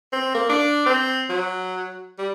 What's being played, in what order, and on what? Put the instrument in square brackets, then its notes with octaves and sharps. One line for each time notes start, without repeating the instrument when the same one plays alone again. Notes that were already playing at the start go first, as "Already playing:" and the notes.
[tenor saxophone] C4
A#3
D4
C4
F#3
G3